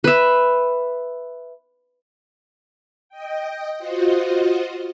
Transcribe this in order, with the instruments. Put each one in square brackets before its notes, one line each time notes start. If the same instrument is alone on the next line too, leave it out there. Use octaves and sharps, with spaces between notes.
[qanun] B4 E5
[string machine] D#5 G5
F4 F#4 C5 D#5